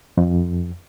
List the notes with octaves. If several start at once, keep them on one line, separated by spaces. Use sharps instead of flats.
F2